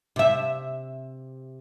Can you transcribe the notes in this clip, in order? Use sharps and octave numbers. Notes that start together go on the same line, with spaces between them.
C3 E5